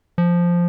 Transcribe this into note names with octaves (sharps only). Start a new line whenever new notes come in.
F3